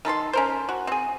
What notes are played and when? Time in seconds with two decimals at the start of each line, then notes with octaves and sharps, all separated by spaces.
0.05 D#3 A4 B5 C6
0.33 C#4 A#4 C5
0.69 F#4
0.87 C4 G#4